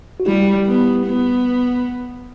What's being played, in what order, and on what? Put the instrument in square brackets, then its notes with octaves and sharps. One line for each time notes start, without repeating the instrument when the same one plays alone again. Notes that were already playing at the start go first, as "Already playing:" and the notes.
[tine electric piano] F#4
[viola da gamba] G3 [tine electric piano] E4 G4
[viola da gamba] B3
B3